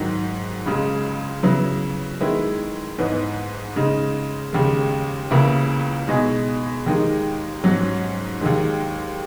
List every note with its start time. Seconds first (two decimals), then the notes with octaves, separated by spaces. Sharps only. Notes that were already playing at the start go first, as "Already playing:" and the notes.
Already playing: G#2 D#3 F#3
0.66 C#2 C#3 G#3
1.43 C#3 F#3 B3 E4
2.20 D#3 G#3 B3 E4
2.98 G#2 E3 B3 D#4
3.76 C#3 G#3 D#4
4.53 D#2 C#3 G#3
5.31 C#2 C#3 E3 A#3 E4
6.08 B2 G#3 D#4 G#4
6.86 D#2 D#3 G#3 D#4
7.64 G#2 F#3 C#4
8.41 D#2 D#3 G#3